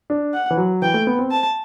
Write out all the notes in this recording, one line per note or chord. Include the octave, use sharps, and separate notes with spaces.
D4
F#5
E3
F#3
E3 G5
A3
B3
C4
A5